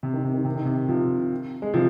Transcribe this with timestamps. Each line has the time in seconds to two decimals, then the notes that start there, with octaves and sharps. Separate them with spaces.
0.03 C3
0.14 D#3
0.24 C3
0.34 D#3
0.45 C3
0.55 D#3
0.65 C3
0.89 C3 F3
1.62 G#3
1.74 C3 F3